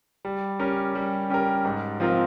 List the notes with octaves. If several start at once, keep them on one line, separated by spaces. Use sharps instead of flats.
G3
C#4 G4 A#4
G3
C#4 G4 A#4
G#2
F3 C4 F4 A#4